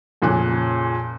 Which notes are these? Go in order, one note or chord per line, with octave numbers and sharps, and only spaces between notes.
F2 A#2 C#3 G#5 F#6